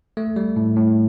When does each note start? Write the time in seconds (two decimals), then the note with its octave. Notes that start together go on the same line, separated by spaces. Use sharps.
0.17 A3
0.36 G3
0.56 A2
0.76 A2